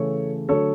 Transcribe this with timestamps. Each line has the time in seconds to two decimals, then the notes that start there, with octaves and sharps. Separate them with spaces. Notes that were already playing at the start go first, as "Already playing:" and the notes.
Already playing: C#3 E3 A3 A4 C#5
0.49 D3 F#3 A3 A4 C#5